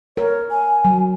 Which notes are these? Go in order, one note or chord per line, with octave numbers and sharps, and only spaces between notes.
A#4 C#5
G#5
F#3